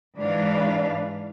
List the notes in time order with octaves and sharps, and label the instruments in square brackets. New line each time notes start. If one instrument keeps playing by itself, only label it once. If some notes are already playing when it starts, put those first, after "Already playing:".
[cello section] G#2 E3 D4 B4 F5